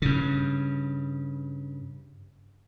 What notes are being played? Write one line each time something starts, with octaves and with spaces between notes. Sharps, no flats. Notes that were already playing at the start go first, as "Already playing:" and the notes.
G2 C#3